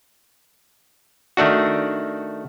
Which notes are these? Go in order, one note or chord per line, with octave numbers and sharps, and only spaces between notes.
D#3 A3 D4 F#4